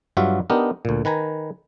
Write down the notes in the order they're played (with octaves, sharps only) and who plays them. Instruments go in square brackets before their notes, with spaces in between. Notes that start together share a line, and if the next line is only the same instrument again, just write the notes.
[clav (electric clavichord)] G2 F#3 F4 F#4 E5
B3 D4 D#4 G4 A#4
D2 A#2
D#3 B4 G#5 A#5